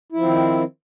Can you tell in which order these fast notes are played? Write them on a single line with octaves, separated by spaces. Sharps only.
E4 F3 C4 D#3